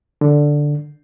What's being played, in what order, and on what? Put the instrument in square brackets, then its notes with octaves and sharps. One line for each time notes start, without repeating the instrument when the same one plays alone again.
[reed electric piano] D3